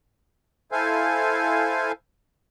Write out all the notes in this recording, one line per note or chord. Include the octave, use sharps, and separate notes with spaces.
E4 A4 C5 F5 G#5